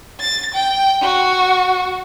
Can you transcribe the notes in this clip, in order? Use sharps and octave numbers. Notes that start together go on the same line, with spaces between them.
A6
G5
F#4